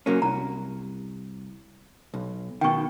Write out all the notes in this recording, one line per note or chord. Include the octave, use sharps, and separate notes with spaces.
F#3 A#3 C#4
C2 A#5
B1
B2 D#3 G5 C#6